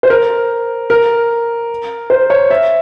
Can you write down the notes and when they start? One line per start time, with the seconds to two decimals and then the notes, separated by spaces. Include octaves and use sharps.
0.03 C5
0.10 A#4
0.90 A#4
2.10 C5
2.30 C#5
2.51 E5